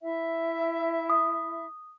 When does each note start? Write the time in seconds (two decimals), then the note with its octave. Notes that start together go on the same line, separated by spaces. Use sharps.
0.01 E4 E5
1.10 D#6